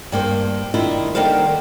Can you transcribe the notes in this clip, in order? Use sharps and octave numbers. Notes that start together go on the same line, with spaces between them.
G2 A#3 C5
D#3 D4 E4 F4
D3 D#3 G3 A#3 C5 F5